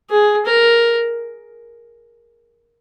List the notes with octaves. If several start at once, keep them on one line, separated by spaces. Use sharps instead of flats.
G#4
A#4